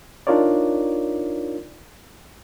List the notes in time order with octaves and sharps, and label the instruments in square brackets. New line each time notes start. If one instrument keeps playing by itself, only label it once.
[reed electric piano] D4 D#4 F4 A#4 C#5 D5